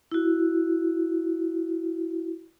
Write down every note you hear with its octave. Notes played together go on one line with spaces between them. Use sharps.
E4 F#4